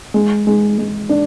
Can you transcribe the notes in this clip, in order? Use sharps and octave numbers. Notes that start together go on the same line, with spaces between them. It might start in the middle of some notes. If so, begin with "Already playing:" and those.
G#3
G#3
G#3
D4